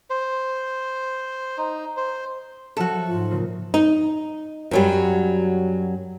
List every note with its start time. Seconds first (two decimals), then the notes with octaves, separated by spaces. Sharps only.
0.10 C5
1.58 D#4
1.97 C5
2.77 F3 F#3 F#4 A4 E5
3.08 G#2 F4
3.30 A#2 C#3 A#3
3.74 D#4
4.71 F#2 F#3 G3